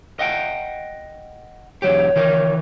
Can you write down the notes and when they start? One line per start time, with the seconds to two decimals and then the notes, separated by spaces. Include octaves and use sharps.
0.19 D#5 F#5 G5
1.82 E2 F#3 G4 C#5
2.16 D#3 E3 A#4